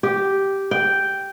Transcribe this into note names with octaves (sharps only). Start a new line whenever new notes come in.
G4
G5